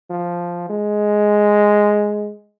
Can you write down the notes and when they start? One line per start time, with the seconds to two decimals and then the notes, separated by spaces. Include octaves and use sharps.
0.10 F3
0.69 G#3